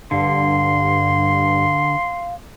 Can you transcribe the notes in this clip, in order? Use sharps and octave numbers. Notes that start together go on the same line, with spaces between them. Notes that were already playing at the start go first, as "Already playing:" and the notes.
G2 D3 F5 C6